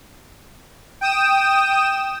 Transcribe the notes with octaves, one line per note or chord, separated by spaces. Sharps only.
G5 D#6 E7